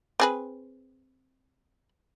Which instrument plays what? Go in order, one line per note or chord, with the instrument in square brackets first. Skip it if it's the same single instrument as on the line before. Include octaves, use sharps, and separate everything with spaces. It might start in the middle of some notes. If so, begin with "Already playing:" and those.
[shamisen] C4 G#4 B4